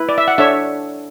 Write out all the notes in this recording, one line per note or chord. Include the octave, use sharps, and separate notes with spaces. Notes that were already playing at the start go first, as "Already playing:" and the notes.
Already playing: E4 B4
D5
E5
F#5
D4 A4 C#5 E5